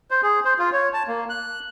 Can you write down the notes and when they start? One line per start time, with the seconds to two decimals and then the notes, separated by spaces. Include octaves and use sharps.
0.11 C5
0.23 G#4
0.45 C5
0.59 F4
0.73 C#5
0.93 A5
1.08 A#3
1.29 F#6